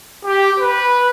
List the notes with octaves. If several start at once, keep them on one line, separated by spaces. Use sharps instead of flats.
G4
B4